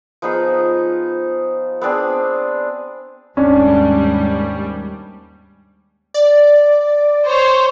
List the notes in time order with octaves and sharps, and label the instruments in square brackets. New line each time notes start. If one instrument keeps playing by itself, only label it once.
[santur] F3 B3 D#4 G#4
B3 C4 D4 G#4
[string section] D#2 G#2 G3 [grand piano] C#4 D4
[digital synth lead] D5
[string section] C5 C#5